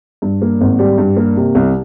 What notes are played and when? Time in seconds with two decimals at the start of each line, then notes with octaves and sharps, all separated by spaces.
0.22 G2
0.42 A#3
0.61 G#1
0.79 G3
0.98 G2
1.17 A#3
1.36 C3
1.55 C2